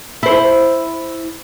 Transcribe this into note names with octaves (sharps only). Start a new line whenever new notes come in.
E4 C5